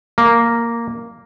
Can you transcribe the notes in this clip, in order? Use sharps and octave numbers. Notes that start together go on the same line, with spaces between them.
A#3